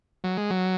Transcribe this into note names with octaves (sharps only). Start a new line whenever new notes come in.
F#3
G#3
F#3